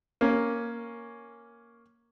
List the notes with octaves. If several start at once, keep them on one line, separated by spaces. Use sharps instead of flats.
A#3 C#4